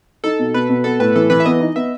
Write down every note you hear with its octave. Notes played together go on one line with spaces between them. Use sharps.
D#4 A4
B2
B2 B4
B2
B3 A4
A2 B4
E3 A4
E3 B4
E5
B3 D#5
D#4
B3 E5